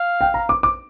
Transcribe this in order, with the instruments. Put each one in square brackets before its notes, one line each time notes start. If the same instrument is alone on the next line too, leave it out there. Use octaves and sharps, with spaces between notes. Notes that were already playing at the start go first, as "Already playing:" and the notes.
Already playing: [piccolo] F5
[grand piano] G5
A#5
D6
D6